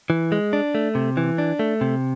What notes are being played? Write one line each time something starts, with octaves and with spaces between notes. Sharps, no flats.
E3
G#3
D4
A3
C3
E3
D4
A3
C3